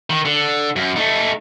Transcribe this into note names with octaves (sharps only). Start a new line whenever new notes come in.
D#3
D3
F#2
A3 D#4